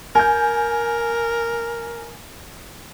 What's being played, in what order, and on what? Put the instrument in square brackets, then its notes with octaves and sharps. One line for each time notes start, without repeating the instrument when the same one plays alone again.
[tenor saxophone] A#4 [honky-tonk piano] G#5 G6